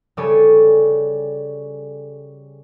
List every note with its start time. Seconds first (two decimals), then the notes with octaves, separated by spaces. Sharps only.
0.17 C#3 G3 A4 C#5 D5 D#7